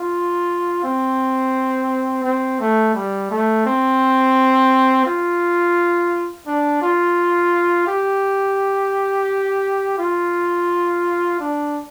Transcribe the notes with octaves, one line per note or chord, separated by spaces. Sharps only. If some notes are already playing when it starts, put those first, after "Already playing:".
Already playing: F4
C4
C4
A3
G3
A3
C4
F4
D4
F4
G4
F4
D4